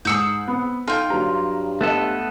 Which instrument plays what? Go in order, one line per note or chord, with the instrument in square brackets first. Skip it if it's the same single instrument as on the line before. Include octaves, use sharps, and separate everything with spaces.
[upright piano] G#2 C#7 F#7 [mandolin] G#4 E6 G6
[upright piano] B3 C4
[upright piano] D#4 A4 [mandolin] F4 G5
[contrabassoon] G2 [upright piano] F#3 A#5
[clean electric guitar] A3 B3 A4 [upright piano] D#5 F#6